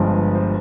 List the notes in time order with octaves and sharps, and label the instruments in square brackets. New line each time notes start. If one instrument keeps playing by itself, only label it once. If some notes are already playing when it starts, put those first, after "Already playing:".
Already playing: [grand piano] G1 G2 F3 G#3
C5